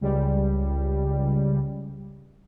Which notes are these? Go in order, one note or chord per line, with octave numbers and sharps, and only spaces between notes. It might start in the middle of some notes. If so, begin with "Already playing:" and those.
C#2 G3